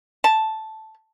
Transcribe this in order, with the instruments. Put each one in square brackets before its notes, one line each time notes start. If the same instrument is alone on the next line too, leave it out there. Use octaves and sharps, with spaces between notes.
[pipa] A5